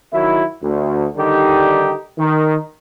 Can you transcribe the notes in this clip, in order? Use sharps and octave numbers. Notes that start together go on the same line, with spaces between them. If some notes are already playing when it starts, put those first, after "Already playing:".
D#3 F#3 E4
D2
D3 D#3 G3 D#4 G4
D#3